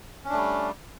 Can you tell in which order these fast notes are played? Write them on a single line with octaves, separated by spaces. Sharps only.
C#4 D4 A3 G3